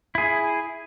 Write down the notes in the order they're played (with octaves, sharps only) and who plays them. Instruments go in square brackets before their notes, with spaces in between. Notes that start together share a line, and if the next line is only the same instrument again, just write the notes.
[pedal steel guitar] E4 G#4